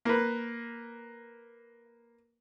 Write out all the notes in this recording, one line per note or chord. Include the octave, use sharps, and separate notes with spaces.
A#3 B4